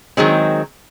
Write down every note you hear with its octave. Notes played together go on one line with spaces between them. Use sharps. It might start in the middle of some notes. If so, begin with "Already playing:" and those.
D#3 F#3 G#3 C4